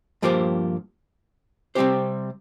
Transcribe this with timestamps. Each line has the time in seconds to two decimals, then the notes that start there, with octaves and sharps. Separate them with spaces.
0.22 G2 F3 A#3 G4 C5
1.75 C3 G3 C4 G4 C5